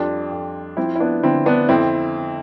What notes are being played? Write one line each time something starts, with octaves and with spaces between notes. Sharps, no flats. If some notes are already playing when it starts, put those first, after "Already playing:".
Already playing: F2 G3 D4 F4
F2
F3 C4 E4
E4
B3 D4
D3 C4 E4
B3 D4
F2 C4 E4